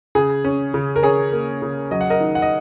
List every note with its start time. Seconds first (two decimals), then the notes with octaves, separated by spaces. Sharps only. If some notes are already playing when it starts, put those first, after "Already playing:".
0.15 C#3 G#4
0.44 C#4
0.74 C#3
0.96 A#4
1.03 C#4 G#4 C#5
1.33 A#3
1.62 C#3
1.91 F#3 D#5
2.01 F#5
2.10 A#4 D#5
2.20 D#3
2.35 F#5
2.42 D#5